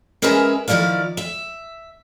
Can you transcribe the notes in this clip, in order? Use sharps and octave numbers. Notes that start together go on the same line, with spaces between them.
G#3 C#4 G#4 A#4 B4 E5
D#3 F3 A#3 E4 D5 F5
E5